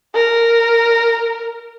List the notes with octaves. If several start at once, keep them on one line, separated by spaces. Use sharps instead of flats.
A#4